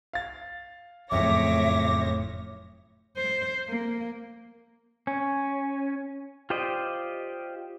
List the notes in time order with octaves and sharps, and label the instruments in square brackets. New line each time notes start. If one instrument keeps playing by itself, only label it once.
[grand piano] F5 A6
[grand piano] F#1 F2 [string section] A2 C#5 A#6 [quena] E5 [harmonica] D6
[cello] C5
A#3
[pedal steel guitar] C#4
F4 G4 C5 D5 D#5